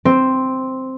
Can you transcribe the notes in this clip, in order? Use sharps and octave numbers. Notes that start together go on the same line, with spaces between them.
C4